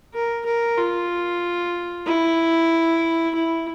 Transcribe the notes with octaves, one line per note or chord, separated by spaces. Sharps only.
A#4
A#4
F4
E4
E4